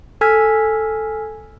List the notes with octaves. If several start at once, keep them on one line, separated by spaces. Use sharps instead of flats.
A4 G#5 E6 F6 G#6 B6